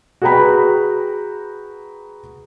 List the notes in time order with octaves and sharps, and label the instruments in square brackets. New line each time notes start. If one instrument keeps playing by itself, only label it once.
[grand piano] F#4 G#4 B4 G5 A#5 B5